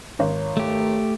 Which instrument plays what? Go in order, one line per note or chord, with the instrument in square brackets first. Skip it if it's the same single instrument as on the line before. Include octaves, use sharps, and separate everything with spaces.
[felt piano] G#1 C#5
[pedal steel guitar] A3 G4